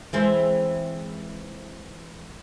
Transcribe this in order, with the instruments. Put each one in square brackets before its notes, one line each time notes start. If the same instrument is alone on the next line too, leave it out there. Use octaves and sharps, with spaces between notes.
[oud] E3 G#3 C4